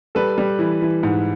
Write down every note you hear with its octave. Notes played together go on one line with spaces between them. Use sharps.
G3 A4 B4
G3
E3
E3
G#2